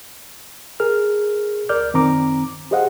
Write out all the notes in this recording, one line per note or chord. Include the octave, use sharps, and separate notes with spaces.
G#4 A#4 F6
C#2 A#4 D5 D6 F6 G6
F#2 D#3 C4 A#5 D6
G4 G#4 C5 D#5 F5 F#5